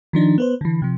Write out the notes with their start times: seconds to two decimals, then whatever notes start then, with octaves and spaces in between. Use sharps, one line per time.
0.13 D#3 F3 D4 D#4
0.38 B3 B4 C5
0.61 D3 E3
0.82 C3 F3